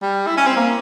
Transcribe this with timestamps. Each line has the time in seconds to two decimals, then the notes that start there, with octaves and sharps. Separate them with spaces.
0.02 G3
0.27 E4
0.37 C#4
0.47 C4
0.56 A#3